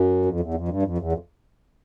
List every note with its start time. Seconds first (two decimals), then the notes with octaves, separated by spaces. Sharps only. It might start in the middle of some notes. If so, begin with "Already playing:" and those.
Already playing: F#2
0.25 F2
0.40 E2
0.54 F2
0.68 G2
0.83 F2
0.98 E2
1.12 F2